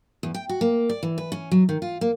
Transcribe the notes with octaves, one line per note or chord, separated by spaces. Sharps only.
E2
G5
F#4
A#3
D5
E3
B4
C#4
F#3
D#3
F4
A#3